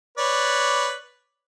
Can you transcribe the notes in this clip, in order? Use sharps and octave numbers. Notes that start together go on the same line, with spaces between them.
B4 C#5 D5